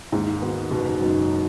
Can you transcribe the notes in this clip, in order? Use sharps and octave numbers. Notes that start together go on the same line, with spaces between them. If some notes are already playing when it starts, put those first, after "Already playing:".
D#2 G#2
D#3 B3 F#4
F#1 B2
F#2 F#3 B3 D#4